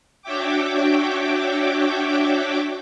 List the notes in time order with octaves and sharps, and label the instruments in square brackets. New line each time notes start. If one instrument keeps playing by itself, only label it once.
[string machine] D4 F#4 C#5 E5 G5 D6